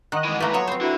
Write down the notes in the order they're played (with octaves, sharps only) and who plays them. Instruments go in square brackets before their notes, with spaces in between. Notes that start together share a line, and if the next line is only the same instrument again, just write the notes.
[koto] D#3 [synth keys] D#5 F#5 F#6
[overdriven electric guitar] G#2 E3
[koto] A3 A#3 [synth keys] B4 A#5
[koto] F3 F#3 B3 [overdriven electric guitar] C#5
[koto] C4 C5
[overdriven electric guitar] D3 [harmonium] E4 F#4